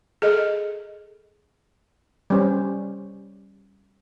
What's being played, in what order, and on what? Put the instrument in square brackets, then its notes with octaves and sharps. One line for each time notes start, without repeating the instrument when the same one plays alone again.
[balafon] G#4 A4 D#5
[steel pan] G3 C#4 C5